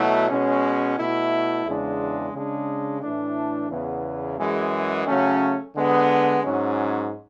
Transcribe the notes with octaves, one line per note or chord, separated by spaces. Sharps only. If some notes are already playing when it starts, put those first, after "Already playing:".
Already playing: B2 F#3 A3 E4
B2 G#3 C#4
B2 A3 E4
E2 C#3 G#3 D4
C#3 G#3 D4
A2 E3 A3 D4
E2 C#3 E3 B3
F#2 E3 G#3
C#3 F#3 A3 C#4
D3 G#3 B3
G#2 F#3 C#4